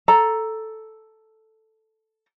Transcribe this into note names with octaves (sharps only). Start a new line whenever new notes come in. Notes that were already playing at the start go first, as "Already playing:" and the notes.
A4 A#5